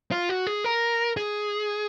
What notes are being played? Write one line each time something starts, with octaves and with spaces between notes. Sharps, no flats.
F4
F#4
G#4
A#4
G#4